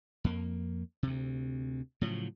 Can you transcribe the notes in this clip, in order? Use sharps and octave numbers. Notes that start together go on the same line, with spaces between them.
F2 A#3
D2 C3
A2 C#3 F3 F#3